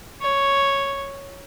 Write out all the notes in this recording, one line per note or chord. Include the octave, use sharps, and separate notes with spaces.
C#5